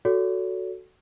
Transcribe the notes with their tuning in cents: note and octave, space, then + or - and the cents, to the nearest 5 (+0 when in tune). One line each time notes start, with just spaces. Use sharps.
F#4 +0 A4 +0 C#5 +35